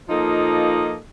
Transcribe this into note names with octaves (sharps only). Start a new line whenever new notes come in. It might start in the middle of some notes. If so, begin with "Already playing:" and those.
F3 A#3 D#4 F4 A4 D#5